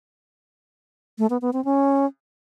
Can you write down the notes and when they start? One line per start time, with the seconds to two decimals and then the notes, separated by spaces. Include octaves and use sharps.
1.19 A3
1.30 B3
1.42 B3
1.53 C4
1.65 C#4